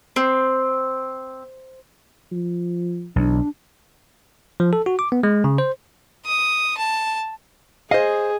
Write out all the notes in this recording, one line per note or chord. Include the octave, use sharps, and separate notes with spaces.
C4 C5
F3
B1 E2 D4
F3
A4
F#4
D6
B3
G#3
C#3
C5
D#6
A5
G#4 C5 D#5 F5